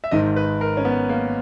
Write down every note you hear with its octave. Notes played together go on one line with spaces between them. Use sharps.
E5
G#1 G#2 D#3 D#5
B4
A#4
C#4
B3
A#3